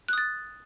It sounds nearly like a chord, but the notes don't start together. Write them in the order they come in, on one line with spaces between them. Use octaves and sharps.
F#6 D#6 A6